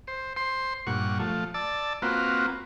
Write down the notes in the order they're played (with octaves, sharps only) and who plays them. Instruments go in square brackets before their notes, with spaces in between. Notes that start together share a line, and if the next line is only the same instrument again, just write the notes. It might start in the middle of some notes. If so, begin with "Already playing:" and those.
[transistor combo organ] C5
C5 C6
G2 A#2 F#5 C#6
F3 A3
D5 A5 E6
A#3 C4 F4 F#4 B4